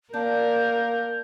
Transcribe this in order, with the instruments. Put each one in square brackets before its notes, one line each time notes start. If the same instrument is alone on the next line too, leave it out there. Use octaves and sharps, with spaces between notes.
[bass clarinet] A#3 [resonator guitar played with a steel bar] D4 [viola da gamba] A#4 [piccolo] G6